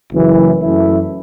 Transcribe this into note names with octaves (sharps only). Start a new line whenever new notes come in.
F#1 F#2 E3
F#2 E3 A3 E4